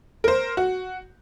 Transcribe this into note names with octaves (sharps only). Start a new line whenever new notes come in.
A#4 C5
F#4